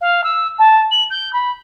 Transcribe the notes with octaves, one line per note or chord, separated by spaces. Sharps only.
F5
E6
A5
F#7
G6
B5